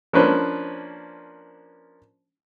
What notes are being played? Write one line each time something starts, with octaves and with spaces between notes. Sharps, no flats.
F3 A#3 C#4 D4 B4 C5